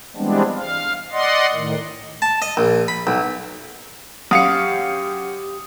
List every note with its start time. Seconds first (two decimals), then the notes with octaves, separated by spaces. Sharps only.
0.17 E3 G3 G#3 B3 C4 D4
0.56 F5
1.12 D5 D#5 F#5 C6
1.53 A2 D#3
2.22 A5
2.42 D#5
2.57 A#1
2.88 B5
3.07 B1
4.31 F#2 G4 F5 D#6 C#7